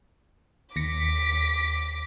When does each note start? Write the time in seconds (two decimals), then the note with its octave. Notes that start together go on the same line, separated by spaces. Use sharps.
0.76 D#2 D6 A#6 B6 C#7